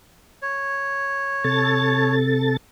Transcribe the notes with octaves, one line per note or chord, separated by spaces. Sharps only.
C#5
C3 A4 A6